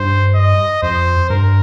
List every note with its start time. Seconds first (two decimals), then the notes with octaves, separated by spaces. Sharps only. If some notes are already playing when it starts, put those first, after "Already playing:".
Already playing: G2 C5
0.35 D#5
0.82 F2 C5
1.30 G2 A#4